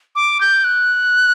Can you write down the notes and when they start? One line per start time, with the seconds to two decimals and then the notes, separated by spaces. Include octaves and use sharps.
0.16 D6
0.41 G6
0.64 F#6